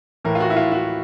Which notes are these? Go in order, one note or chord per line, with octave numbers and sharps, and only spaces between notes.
A2 E3 A#4
F4
F#4
E4
F4
F#4